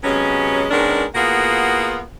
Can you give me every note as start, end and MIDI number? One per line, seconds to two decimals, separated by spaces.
0.04 0.66 48
0.04 0.66 54
0.04 0.66 56
0.04 0.66 59
0.04 0.66 61
0.71 1.05 51
0.71 1.05 56
0.71 1.05 59
0.71 1.05 61
0.71 1.05 62
0.71 1.05 70
1.15 2.03 45
1.15 2.03 58
1.15 2.03 59
1.15 2.03 65
1.15 2.03 66
1.15 2.03 68